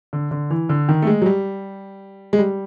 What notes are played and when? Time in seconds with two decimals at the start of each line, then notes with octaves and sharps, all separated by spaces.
0.13 D3
0.31 D3
0.50 E3
0.69 D3
0.89 D#3
1.02 A3
1.07 G#3
1.22 F#3
1.26 G3
2.33 G#3
2.39 G3